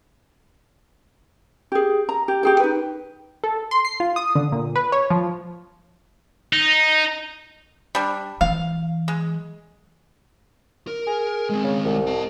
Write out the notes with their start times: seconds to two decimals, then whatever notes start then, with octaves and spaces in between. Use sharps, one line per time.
1.72 G4 G#4
2.09 A#5
2.28 G4
2.43 G4 G#4 G5
2.60 D#4 B4
3.44 A4
3.71 C6
3.85 C7
4.00 F4
4.16 D#6
4.35 D3
4.52 A#2
4.76 B4
4.92 C#5
5.10 F3
6.53 D#4
7.95 G3 D4
8.41 E3 F#3 F5
9.08 G#3
10.87 A#4
11.07 G#4
11.49 G#3 C4
11.64 C#3
11.85 C2
12.07 D#5 A5